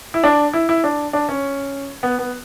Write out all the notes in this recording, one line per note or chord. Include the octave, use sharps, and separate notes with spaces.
E4
D4
E4
E4
D4
D4
C#4
B3
B3